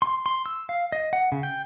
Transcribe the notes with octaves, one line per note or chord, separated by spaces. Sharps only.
C6
C6
E6
F5
D#5
F#5
C#3
G5